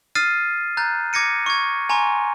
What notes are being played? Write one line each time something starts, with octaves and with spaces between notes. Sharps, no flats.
D#6 F6 A6 C7 D#7
A#5 F#6 G6 A6
D6 G#6 A#6 C#7 D#7
C#6 G#6
G#5 A#5 C6 C#6